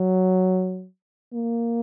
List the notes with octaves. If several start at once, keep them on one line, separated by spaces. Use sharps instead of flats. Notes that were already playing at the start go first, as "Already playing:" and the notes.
Already playing: F#3
A#3